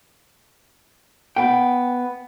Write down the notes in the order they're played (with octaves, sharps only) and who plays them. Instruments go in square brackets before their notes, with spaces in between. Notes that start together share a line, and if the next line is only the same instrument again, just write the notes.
[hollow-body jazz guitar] B3 G5